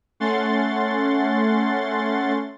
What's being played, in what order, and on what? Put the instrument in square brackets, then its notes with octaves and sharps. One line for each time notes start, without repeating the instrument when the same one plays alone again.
[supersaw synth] A3 C#4 F#5 C6 A6